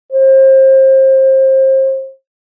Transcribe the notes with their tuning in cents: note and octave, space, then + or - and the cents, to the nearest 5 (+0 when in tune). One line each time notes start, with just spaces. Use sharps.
C5 +30